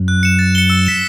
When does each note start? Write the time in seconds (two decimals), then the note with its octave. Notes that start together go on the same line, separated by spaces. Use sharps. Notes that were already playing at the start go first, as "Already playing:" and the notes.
Already playing: F#2
0.08 F#6
0.23 C#7 E7
0.39 A6
0.55 C#7 E7 G7
0.70 E6
0.86 B6 E7 G7